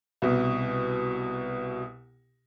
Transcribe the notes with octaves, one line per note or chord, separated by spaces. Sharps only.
C2 B2